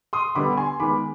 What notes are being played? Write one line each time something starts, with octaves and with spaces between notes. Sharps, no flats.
C6 D#6
D3 G3 B3 B5 D6
G#5 C6
D#3 G#3 B3 B5 D6